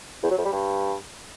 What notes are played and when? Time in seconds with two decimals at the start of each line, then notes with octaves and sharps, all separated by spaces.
0.23 E2
0.30 F#3
0.38 F2
0.45 G3
0.52 G2